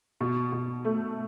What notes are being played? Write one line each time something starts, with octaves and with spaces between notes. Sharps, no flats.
B2
B2
A3